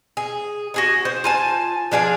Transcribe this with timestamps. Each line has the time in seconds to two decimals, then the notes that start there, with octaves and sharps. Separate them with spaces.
0.17 G#4
0.74 F#4 G#4 G#5
1.05 C5
1.24 F4 G#5 A5
1.92 F3 D4 G#4 F5